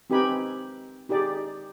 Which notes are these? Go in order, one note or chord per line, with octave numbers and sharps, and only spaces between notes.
C4 D#4 G4 B4 G#5 B5
D#4 G4 G#4 D5